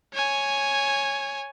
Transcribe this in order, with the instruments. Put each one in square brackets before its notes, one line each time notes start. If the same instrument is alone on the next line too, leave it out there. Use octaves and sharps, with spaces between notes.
[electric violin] C#5 G#5